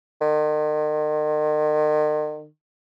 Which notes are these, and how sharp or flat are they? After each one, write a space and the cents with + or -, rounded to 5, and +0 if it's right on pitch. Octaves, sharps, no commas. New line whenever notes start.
D#3 -40